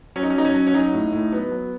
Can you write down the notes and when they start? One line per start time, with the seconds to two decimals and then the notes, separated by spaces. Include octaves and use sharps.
0.16 F#3 C#4
0.23 D#4
0.30 C#4
0.35 F#3 D#4
0.45 C#4
0.54 F#3
0.67 C#4
0.74 F#3 D#4
0.93 A2
1.13 A2
1.32 F#3 B3
1.51 F#3